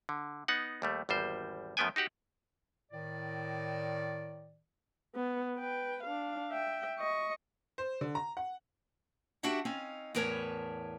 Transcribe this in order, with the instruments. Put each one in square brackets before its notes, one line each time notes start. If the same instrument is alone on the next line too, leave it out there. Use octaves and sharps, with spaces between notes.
[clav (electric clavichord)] D3
B3 D#4 F#5
D#2 G3 A3
G#1 E2 G3 C5
F#2 F3 A3 B3 G5 G#5
D#4 F#4 G4 F#5
[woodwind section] A2 D#3 D5
[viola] B3
B4 G5
D4 F5
E5 G5
D#5 C#6
[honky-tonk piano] C5
D3
A#5
F#5
[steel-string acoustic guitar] D4 F#4 G4 E5 F#5
C4 C#4 D#4 F5
E2 A2 A#4 B4 C#5 A5